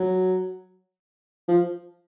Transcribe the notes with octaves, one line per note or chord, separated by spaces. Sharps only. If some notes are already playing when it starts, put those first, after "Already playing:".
Already playing: F#3
F3